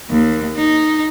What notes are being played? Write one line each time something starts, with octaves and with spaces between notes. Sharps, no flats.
D#2
D#4